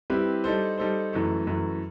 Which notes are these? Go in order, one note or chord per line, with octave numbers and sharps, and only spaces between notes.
G3 C4 E4 G4 B4
G3 D#4 A4 C5
G3 D#4 A4 C5
F#2 E3 A3
F#2 E3 A3